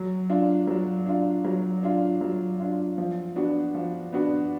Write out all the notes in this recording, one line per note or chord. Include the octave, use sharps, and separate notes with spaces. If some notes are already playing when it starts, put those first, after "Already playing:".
Already playing: F#3
D4 F4
F#3
D4 F4
F#3
D4 F4
F#3
D4 F4
F3
B3 D4 F#4
F3
B3 D4 F#4